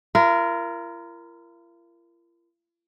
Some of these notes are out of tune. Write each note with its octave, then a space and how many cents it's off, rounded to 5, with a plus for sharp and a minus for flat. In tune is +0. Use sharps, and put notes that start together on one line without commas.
F4 -45 A#4 +0